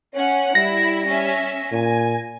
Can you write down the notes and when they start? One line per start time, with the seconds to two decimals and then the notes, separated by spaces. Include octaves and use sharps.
0.14 C#4 C#5 F#5
0.55 G3 E4 A#6
1.07 C#4 E5
1.72 A#2 G#5